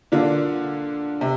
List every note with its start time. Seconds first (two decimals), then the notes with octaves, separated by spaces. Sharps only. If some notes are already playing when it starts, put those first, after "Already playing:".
0.12 D3 A#3 D4 F4
1.21 C3